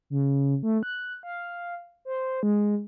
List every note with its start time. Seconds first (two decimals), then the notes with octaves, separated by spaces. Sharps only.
0.10 C#3
0.63 A3
0.83 F#6
1.23 F5
2.05 C5
2.43 G#3